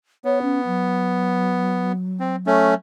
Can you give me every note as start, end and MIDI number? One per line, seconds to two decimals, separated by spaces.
0.25 1.92 59
0.25 0.42 73
0.42 0.60 61
0.66 2.76 54
2.20 2.36 60
2.47 2.74 57
2.47 2.74 61